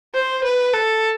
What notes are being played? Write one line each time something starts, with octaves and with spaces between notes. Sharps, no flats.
C5
B4
A4